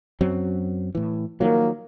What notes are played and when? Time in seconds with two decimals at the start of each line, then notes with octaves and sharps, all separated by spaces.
0.21 F#2 F#3 C4
0.95 A2 E3
1.41 D#3 F3 F#3 A#3